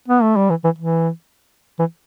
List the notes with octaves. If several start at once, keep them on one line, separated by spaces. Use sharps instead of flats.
B3
A3
G3
E3
E3
E3
E3